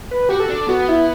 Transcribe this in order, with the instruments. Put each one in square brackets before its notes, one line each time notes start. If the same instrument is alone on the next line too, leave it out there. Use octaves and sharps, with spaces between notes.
[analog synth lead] B4
[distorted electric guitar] F#4 [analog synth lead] G4
[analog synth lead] A4
[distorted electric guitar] D4
[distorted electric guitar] B3 [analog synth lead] F#4
[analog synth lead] E4